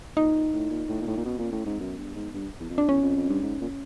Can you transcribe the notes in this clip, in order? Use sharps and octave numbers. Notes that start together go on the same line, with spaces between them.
A#2 D#4
A#2
A2
A#2
A2
A#2
A2
A#2
B2 C#4
A#2 C4
C#4
A2
G#2
C4
F#2 B3
G2
G#2
G2
E2
F2
D4
E2 C#4
F2
F2
G2
G#2
A#2